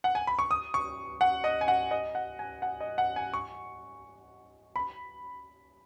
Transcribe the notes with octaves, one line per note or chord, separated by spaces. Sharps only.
F#5
G#5
B5
C#6
D#6
C#6
F#5
D#5
G#5
F#5
D#5
F#5
G#5
F#5
D#5
F#5
G#5
C#6
B5